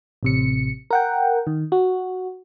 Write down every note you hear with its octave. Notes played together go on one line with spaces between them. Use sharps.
A1 C3 C#7
A#4 F#5 G5
D#3
F#4